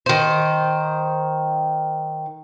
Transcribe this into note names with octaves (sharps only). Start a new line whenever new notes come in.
D#3 C5